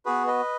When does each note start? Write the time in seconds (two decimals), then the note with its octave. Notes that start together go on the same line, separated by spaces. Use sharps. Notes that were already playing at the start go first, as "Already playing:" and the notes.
0.05 B3 F#4 G#4 B4
0.27 B4 D#5